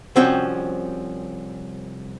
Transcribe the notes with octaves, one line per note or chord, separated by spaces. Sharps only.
C2 F3 C4 C#4 F#4 G5